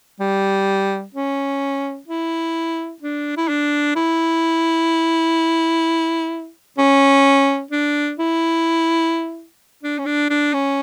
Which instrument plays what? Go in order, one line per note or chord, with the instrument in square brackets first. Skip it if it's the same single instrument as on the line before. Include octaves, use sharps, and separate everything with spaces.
[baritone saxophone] G3
C#4
E4
D4
E4
D4
E4
C#4
D4
E4
D4
C#4
D4
D4
C#4